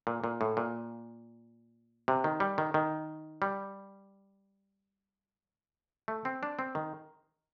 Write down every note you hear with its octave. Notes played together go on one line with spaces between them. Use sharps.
A#2
A#2
A2
A#2
C3
D#3
G3
D#3
D#3
G3
A3
C4
D4
C4
D#3